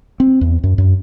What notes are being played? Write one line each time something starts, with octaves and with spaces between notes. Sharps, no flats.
C4
E2
F#2
F#2